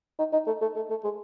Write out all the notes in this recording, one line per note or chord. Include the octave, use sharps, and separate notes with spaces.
D#4
D#4
A3
A3
A3
A3
G#3